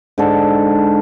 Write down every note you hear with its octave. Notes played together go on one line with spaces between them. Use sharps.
G#2 D3 A4